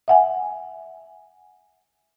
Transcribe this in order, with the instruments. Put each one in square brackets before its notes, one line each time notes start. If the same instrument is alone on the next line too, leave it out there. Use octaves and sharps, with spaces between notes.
[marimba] E5 F#5 G#5